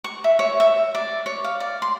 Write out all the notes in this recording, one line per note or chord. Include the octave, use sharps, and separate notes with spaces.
C#6
E5
C#5
E5
D5
C#5
F5
D5
C6